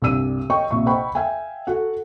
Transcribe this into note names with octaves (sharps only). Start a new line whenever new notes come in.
C2 G2 D5 E6 D#7
C#5 D#5 F5 G5 C#6
A#1 C3 E5 C#6
C5 D#5 F#5 G5 B5 C#6
E5 F5 G5 G#5
F#4 A4 F#5